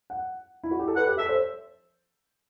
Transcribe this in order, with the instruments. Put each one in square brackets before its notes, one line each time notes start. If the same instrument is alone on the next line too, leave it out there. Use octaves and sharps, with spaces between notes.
[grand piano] F#5
E4
F#4
G4
A4
[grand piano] B4 [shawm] F#5
[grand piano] G4
[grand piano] A4 [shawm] E5
[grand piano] C5